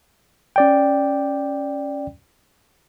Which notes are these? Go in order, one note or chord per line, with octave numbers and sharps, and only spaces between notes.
C#4 D5 G5